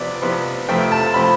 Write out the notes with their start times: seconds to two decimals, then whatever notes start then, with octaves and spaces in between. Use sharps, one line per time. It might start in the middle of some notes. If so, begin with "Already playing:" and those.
Already playing: C3 F3 B3 D5
0.22 C3 F3 B3
0.69 F2 C3 F3 A3 C4 G5
0.92 A5
1.14 C3 F3 A3 C4 B5